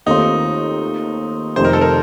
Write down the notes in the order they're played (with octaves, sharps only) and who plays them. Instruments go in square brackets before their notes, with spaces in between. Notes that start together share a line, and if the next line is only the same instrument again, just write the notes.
[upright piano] D#2 D#3 A3 C4 F4 [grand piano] D#4
[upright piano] F1 F2 C3 D#3 [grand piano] C5
[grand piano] A#4
A4
A#4